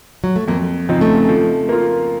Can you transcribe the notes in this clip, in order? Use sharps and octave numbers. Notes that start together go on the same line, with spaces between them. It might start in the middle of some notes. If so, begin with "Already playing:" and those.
F#3
A3
F2 A#3
C#3 F3 C4 D#4
A3
F3
A#3 F4